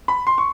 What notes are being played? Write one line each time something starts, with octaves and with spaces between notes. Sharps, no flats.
B5
C6
C#6